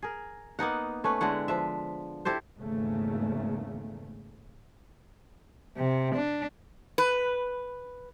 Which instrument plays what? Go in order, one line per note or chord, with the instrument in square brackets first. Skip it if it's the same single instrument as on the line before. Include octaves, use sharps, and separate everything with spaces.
[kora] G#4 A#4
A#3 B3 D#4 F#5
A3 C#4 B4
D3 G#3 E4 F#5
F3 B4 E5
E4 G4 A4 C5
[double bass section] G#1 E2 G#2 C#3 A3 A#3
[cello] C3
D4
[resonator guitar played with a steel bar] B4